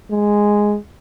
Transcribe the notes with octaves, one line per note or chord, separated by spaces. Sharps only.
G#3